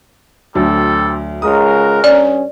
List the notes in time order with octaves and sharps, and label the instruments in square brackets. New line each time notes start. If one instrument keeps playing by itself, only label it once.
[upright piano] D2 F#3 D4 [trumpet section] G3 C4 A4
[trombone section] C#2 G#3 [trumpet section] F#4 A#4 [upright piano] D#6
[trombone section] G2 C#4 [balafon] D5